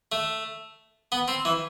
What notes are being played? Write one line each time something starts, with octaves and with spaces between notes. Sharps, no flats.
A3
B3
C4
E3